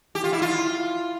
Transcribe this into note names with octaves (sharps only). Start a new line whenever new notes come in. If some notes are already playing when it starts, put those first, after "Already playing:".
G4
F4
E4
F4